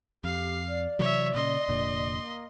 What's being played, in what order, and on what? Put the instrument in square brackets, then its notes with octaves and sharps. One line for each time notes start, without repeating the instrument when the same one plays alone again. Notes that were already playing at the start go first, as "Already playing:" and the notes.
[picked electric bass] F2 [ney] G4 [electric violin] F5 C7
[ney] D5
[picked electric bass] C3 E3 F#3 [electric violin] C#5 E5
[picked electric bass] A#2 C#3 [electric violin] D#5 C6
[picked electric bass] F1 A#2 D3
[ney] A#3